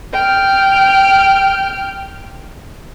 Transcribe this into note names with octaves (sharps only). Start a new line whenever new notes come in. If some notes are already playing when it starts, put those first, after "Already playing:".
G5 F6